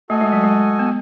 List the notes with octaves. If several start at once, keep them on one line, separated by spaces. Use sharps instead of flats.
A3 F#4 A4 D#5 G#5
G#3
F#3
G#3
B3